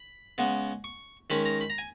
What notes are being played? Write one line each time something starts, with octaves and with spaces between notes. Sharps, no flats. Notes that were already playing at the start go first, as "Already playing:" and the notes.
Already playing: B5
C#3 G#3 B3
C#6
D#3 G#3 C#4 B5
A#5
B5
A#5
G#5